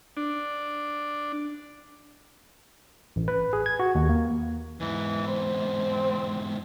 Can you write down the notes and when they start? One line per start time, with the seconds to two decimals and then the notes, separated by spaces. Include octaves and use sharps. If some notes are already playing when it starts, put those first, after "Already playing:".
0.17 D4
3.16 A1
3.28 B4
3.53 G#4
3.66 G#6
3.80 F#4
3.95 D#2
4.09 A#3
4.80 E2 G#2 E3
5.27 C4